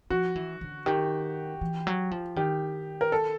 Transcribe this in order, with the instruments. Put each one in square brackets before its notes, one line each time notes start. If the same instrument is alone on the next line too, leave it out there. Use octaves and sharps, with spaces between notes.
[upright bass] F3 [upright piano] F#4
[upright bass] E3
D3
[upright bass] D#3 [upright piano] G4
[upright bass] E3
F#3
F3
[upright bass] D#3 [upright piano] G4
[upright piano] A#4
A4